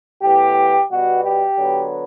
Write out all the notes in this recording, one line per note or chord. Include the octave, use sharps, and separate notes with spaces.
A2 E3 B3 G4
B2 G3 B3 F#4
G4
D3 F#3 B3